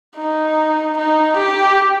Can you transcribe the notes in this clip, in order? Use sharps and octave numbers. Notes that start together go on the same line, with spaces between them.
D#4
D#4
G4